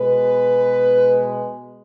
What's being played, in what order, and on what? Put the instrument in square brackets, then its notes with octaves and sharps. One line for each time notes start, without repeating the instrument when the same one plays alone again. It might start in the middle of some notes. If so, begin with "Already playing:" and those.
Already playing: [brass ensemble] B2 G#3 B4